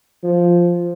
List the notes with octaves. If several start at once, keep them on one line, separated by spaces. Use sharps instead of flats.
F3